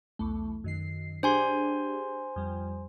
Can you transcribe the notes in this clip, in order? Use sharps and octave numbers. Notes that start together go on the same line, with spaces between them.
B1 E2 A3
F#2 D#3 C7
D4 G4 G#4 C5 G#5 C6
F2 G3